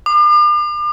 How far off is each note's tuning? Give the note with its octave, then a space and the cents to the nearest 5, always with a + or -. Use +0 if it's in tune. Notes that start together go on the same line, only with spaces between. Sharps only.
D6 +40